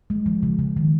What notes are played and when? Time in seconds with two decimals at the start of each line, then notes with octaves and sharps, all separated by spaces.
0.10 G#3
0.26 F3
0.43 C#3
0.59 C#3
0.77 D#3